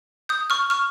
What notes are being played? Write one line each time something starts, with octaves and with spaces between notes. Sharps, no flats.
D#6 G6
C#6 F6
C#6 F6